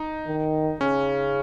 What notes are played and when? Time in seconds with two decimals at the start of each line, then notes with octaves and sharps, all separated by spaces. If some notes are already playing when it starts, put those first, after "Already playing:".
Already playing: D#4
0.27 D#3
0.81 C#3 C#4